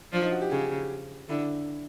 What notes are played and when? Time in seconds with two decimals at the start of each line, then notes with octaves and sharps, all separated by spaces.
0.12 F3 D4
0.22 D#4
0.32 F#4
0.41 G4
0.51 C#3 G#4
1.29 D3 E4